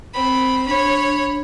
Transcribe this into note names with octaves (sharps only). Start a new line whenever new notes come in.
C4 B5
D4 C#5 B5